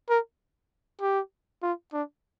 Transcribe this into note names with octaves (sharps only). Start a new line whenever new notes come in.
A#4
G4
F4
D4